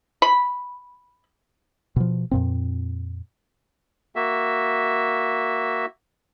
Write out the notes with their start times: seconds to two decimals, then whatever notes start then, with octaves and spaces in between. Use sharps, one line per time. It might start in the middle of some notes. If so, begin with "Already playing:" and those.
0.22 B5
1.96 B2 F3
2.31 F2 A#2 C4
4.16 A#3 F#4 E5